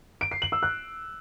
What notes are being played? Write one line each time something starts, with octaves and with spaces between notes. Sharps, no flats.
D7
C7
F#7
E6
F#6